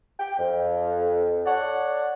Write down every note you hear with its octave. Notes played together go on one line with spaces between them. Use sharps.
G5
F2
A4 C#5 D5 F#5